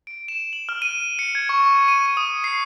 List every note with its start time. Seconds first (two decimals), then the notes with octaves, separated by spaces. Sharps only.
0.07 D7
0.28 E7
0.53 F#7
0.69 F6
0.82 D#7
1.19 C#7
1.35 G#6
1.49 C#6
1.88 D#7
2.06 D#7
2.17 D#6
2.44 C7